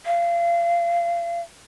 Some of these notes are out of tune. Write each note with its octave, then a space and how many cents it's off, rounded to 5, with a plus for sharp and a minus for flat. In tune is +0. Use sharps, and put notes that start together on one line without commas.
F5 -30